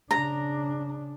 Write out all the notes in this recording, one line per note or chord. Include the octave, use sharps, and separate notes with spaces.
C#3 D4 A#5